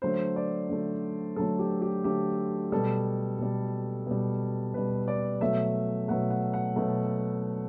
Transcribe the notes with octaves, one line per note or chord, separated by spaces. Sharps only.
D3 F#3 A3 C5
D5
D3 F#3 A3
D3 F#3 A3 A4
G4
G4
D3 F#3 A3 G4
B2 G3 A4
B2 G3
B2 G3
B2 G3 B4
D5
B2 F#3 A3 E5
B2 F#3 A3 F#5
F#5
F#5
B2 F#3 A3